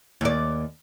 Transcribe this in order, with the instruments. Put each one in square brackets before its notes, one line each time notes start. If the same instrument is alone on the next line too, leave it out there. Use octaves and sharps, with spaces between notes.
[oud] D#2 D5